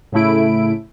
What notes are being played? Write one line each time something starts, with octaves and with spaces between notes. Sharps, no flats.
A2 C#3 A3 E4 D7